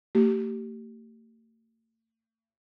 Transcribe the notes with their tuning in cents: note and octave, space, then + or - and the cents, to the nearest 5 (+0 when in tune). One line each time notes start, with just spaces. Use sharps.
A3 +45 G4 -20